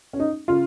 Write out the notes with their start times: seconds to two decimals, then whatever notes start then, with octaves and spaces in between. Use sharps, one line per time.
0.13 C#4
0.20 D#4
0.48 C#3 F4